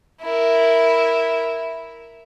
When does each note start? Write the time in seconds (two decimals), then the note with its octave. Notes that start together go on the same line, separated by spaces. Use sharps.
0.21 E4 A#4